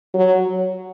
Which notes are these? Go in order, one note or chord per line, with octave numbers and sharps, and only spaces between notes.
F#3